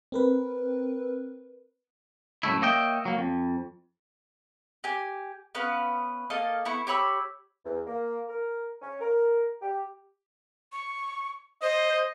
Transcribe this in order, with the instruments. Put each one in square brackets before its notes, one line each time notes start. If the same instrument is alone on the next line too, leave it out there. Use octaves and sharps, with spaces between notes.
[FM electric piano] C4 A#4 B4
[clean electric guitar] F#2 A2 A3 E4
A#3 C#5 D#5 E5 G5
F#3 A#3
F2
[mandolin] G4 G#5
B3 C#4 B4 F5
A#3 A4 D#5 F5
B3 E4 C#6
G4 C#5 B5 E6
[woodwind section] E2
A#3
A#4
C#4
A#4
G4
[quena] C#6
[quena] C5 [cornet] D#5